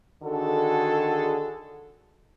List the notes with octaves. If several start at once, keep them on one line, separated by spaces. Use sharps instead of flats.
D3 D#3 F#4 G#4 A4